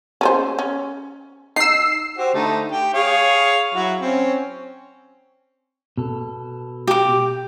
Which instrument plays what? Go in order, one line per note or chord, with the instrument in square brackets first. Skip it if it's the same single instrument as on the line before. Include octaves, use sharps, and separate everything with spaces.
[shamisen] C#4 B4 C5
C#4
[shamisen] D#4 [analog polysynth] E6 C7
[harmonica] F#4 G4 C5
D3 A3 D#4
G4 G5
G#4 C#5 F5
F#3 E4 F#4
C4 C#4
[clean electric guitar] B2 A4
[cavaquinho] G4 D6